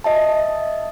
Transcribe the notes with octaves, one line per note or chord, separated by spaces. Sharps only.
D#5 E5 A5